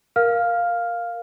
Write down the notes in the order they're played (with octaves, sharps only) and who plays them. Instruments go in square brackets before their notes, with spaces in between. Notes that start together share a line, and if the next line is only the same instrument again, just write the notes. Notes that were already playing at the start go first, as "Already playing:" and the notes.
[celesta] A#4 F5 F6